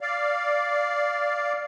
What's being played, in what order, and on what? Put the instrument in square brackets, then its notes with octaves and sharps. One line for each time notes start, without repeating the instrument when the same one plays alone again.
[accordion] D5 F5